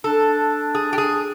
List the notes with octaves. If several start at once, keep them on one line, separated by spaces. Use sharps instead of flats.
D4 A4
G#4
G4
G#4